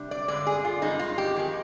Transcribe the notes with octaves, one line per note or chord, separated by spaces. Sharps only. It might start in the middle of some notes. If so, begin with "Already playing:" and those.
Already playing: C3 G3 D4
D5
G2 D3 G#3 D5
G#4
F4
G2 D#3 G#3 D#4
F4
G4
F2 D#3 G#3 D#4